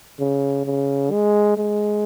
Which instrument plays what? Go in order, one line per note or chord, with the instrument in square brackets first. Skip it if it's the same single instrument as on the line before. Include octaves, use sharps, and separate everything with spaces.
[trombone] C#3
C#3
G#3
G#3